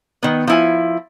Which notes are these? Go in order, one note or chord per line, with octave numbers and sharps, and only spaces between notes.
D#3 B3
F3 E4 G#5